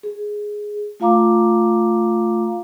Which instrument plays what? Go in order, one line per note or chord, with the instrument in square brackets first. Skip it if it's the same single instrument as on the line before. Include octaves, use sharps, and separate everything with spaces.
[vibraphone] G#4
A3 F4 F5 A#5 D6